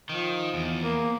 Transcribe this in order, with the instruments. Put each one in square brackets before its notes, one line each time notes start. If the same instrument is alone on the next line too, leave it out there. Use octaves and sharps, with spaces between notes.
[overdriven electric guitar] D#3 [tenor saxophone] F3
[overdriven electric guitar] E2
[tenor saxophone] A#3